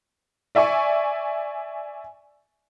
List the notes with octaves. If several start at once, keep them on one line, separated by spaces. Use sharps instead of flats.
D5 E5 G#5 C#6